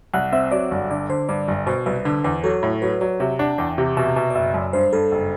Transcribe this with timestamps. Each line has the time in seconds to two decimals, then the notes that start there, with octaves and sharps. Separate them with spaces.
0.14 C2 F#5
0.32 C4 E5
0.51 F#3 D5
0.71 G1
0.90 D3 D5
1.09 D3 C5
1.29 G2 D5
1.48 G1
1.66 B2 C5
1.86 C2 B4
2.05 D3 B4
2.24 E2 B4
2.44 F#3 A4
2.63 A2
2.82 F#3 B4
3.01 F#3 D5
3.20 C3 E5
3.39 D4 F#5
3.58 E2 G5
3.78 C3
3.97 B2 E5
4.16 B2 E5
4.30 D5
4.35 F#1 E5
4.54 F#2
4.73 G2 C5
4.93 G2 A4
5.12 F#1